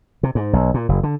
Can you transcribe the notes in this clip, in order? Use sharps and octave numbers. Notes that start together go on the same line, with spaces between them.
C3
G#2
B1
A#2
F#1
D3